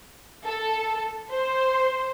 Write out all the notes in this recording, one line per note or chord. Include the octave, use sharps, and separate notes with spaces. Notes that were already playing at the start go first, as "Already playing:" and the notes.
A4
C5